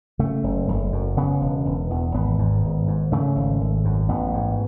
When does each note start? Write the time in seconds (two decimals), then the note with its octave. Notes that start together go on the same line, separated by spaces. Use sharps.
0.19 C#3 A3
0.44 F#1
0.68 F#1
0.92 F#2
1.17 C#3 B3
1.41 E1
1.66 E1
1.90 E2
2.14 G#1 B3
2.39 G#2
2.63 G#1
2.88 G#2
3.12 C#3 A3
3.36 G#1
3.61 G#1
3.85 F#2
4.09 A1 B3
4.34 G#2